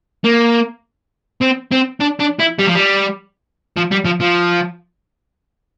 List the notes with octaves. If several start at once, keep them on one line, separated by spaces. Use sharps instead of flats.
A#3
C4
C4
D4
D4
E4
G3
F3
G3
F3
G3
F3
F3